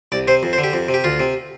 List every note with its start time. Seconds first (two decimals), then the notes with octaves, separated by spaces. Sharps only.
0.12 C2 D5
0.28 C3 C5
0.43 F2
0.53 C5
0.58 D3
0.64 G4
0.73 F2
0.89 C3
0.94 G4
1.04 D2 F4
1.20 C3